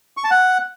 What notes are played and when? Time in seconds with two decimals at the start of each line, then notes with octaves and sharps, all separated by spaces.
0.17 C#6
0.24 A5
0.31 F#5